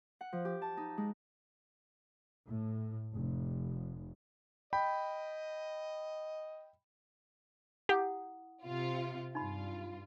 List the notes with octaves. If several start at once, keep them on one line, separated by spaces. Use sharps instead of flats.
F#5
F3
G4
A5
D#4
G#3
A2
F1
D#5 G5 B5
E4 G4 F#5 D#6
C3 F4
G2 D#4 F4 B5